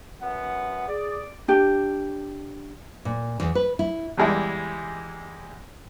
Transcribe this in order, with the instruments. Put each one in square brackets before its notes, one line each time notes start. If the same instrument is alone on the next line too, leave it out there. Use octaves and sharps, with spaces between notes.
[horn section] F#2 B3 F#5
[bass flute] G#4 [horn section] D5
[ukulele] D4 G4
[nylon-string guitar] A#2
E2
B4
E4
[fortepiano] E2 G3 G#3 E4